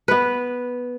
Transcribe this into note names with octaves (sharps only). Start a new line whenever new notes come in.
B3 B4